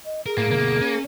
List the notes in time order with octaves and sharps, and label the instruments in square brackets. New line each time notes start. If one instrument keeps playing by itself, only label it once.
[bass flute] D#5
[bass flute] G#4 [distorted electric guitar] A#4
[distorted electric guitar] A2 [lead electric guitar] A#3
[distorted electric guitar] D2 B2 [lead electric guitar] A#3
[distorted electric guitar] C#4